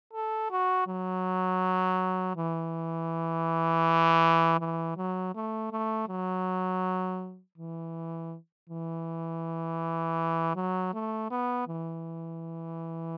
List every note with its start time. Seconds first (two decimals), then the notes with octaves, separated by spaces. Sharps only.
0.13 A4
0.51 F#4
0.87 F#3
2.37 E3
4.60 E3
4.97 F#3
5.35 A3
5.72 A3
6.09 F#3
7.58 E3
8.70 E3
10.56 F#3
10.94 A3
11.31 B3
11.68 E3